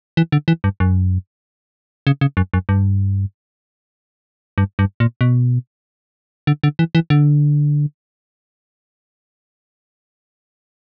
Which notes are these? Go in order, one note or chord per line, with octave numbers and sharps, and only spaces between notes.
E3
D3
E3
G2
F#2
C#3
C#3
F#2
F#2
G2
G2
G2
A#2
B2
D3
D3
E3
E3
D3